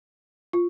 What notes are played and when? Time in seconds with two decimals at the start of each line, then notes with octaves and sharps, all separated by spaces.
0.53 F4